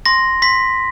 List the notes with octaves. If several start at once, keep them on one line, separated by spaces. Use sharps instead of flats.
C6 A#6
C6 B6